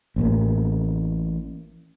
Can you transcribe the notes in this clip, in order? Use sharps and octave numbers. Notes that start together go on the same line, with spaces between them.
A1 A2 A#3